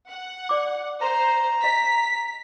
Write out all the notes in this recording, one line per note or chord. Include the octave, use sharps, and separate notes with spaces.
F#5
D5 D6
C5 A#5
D#5 B6